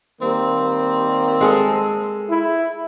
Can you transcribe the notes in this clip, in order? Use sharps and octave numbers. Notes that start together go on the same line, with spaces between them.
D#3 G3 A#3 C4
G#3 G#4 A4
E4